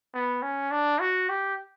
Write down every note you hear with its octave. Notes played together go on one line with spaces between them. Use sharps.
B3
C#4
D4
F#4
G4